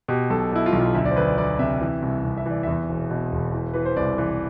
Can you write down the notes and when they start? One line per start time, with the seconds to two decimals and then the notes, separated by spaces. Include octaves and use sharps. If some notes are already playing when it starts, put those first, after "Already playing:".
0.08 B2 G4
0.30 B1 A4
0.52 B2 E4
0.66 F4
0.73 B1
0.81 F4
0.95 D2 E5
1.05 D5
1.11 C5
1.16 D2 B4
1.27 D5
1.38 D2 D5
1.59 C3 E5
1.81 E3
2.02 C2
2.25 C2
2.37 E5
2.46 E3 D5
2.63 E2 E5
2.89 E1
3.11 B2
3.32 E1
3.54 E3
3.74 E3 B4
3.85 C5
3.96 C2 D5
4.18 E3